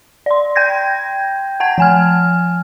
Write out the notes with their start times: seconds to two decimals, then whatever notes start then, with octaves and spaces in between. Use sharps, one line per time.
0.26 D5 C6
0.56 G5 G6 G#6 A#6
1.60 F#5 A5 G#6
1.78 F3 G#5 F6